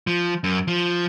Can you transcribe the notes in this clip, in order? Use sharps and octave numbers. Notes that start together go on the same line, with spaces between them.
F3
F#2
F3